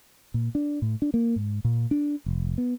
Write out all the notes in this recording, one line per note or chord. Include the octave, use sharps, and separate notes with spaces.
A#2
D4
A2
D4
A#3
G#2
A#2
D4
F1
B3